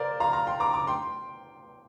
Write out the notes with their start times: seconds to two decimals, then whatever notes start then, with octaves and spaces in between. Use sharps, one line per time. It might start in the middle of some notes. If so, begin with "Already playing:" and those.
Already playing: A#4 C5 D5 F5
0.20 F5 A#5
0.33 F5 A#5
0.47 G5 C6
0.60 A#5 D6
0.74 A#5 D6
0.87 G5 C6